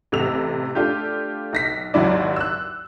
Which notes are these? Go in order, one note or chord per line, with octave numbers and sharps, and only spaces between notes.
A1 C3 A3 E6 F7
A3 D4 F4 G4
B1 A#6 B6
G#1 D#2 F#3 E4 D5
E6 F#6